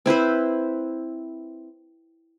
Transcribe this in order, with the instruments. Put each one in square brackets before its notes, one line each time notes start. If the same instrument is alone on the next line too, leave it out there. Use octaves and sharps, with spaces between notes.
[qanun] C4 E4 B4 C5